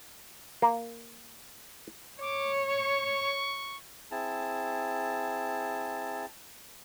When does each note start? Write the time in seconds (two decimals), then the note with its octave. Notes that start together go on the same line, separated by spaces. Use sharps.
0.62 A#3
2.21 C#5 D6
2.68 C#6
4.11 C4 E4 G#4 A5